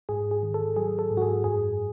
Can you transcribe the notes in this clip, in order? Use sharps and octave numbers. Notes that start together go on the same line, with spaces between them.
G#2 G#4
G#4
D#3
A4
F#3 G#4
A4
G#2
F#4
G#4
F#2 G#4